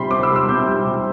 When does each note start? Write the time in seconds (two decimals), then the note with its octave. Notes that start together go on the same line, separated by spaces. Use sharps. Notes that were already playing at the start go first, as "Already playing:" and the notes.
Already playing: C3 G3 B5 C6
0.11 C4 D6
0.23 E6
0.30 G3
0.36 E6
0.49 C3 G6
0.67 G3
0.87 C3